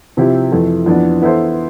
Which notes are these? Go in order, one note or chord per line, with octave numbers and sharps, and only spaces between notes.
C3 F3 C4 E4 G4
F2 E3 A3
F2 E3 B3 D4
E3 B3 E4 A4 C5